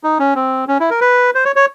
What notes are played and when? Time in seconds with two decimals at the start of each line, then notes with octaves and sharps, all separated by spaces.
0.03 D#4
0.19 C#4
0.35 C4
0.68 C#4
0.80 E4
0.90 A#4
1.01 B4
1.35 C5
1.45 C#5
1.56 C#5